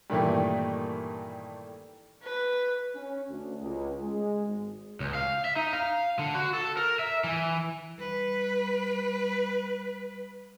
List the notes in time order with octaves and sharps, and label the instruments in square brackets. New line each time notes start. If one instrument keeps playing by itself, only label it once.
[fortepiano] G2 A#2 D#3 E3 A3
[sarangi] B4
[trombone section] C#4
D2
C#2
G#3
G#1
[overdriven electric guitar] C#2
F5
E5
D#4
F5
D3
F#4
A4
A#4
E5
E3
[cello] G3 B4